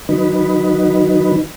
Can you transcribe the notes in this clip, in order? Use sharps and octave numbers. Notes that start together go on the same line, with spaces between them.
D#3 F#3 D#4 B4